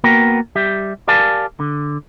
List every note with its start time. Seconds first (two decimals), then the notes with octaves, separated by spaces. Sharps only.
0.04 A#3 B3 F#4 A#4 G5
0.56 G3 G4 E5
1.08 G4 A#4 D5 F5 G#5 A5
1.60 D3